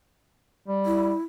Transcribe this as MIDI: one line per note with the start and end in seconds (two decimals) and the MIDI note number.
0.68 1.12 55
0.86 1.21 64